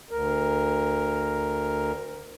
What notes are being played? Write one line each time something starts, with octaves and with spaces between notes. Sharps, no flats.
D2 A#4